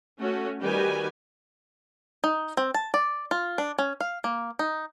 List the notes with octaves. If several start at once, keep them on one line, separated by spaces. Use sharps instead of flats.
A3 C#4 F#4
D#3 G3 F#4 G4 B4 G#5
D#4
C4
A5
D5
F4
D4
C#4
F5
A#3
D#4